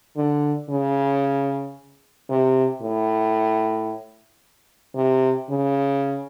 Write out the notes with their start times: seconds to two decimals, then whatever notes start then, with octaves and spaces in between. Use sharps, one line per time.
0.17 D3
0.70 C#3
2.29 C3
2.82 A2
4.95 C3
5.50 C#3